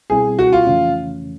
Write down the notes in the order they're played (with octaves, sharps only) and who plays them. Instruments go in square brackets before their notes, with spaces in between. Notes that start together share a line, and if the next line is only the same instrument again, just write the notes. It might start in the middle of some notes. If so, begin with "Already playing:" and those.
[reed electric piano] B2 G3 C4 E4 [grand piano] G#4
[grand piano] F#4
F4
[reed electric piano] F2 C#3 E3 A3 C#4